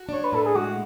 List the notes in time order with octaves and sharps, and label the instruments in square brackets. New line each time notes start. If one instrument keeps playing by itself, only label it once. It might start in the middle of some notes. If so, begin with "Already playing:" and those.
Already playing: [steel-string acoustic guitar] F#4
[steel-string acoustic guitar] D4 [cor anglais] C#5
[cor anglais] B4
[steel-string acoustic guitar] A2 [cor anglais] A4
[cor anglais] G#4
[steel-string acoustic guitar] G#3 [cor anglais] F#4